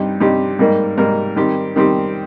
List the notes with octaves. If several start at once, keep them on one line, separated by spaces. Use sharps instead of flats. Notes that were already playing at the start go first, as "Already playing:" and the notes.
Already playing: G2 G3 C4 D#4 G4
G2 G3 C4 D#4 G4
G#2 G3 A#3 D#4 A#4
G#2 G3 A#3 D#4 A#4
D#3 G3 C4 G4
D#3 G3 C4 G4